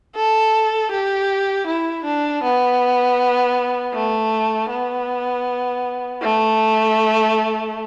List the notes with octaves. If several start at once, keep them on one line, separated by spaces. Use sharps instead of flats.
A4
G4
E4
D4
B3
A3
B3
A3